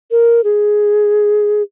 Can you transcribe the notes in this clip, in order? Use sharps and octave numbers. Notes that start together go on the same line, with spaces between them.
A#4
G#4